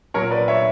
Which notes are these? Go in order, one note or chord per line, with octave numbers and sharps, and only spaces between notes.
A#2 F#3 A#4 C#5
B4 D5
C#5 E5